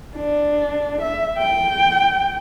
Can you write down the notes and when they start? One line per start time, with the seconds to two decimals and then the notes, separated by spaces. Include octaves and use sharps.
0.16 D4
1.01 E5
1.38 G5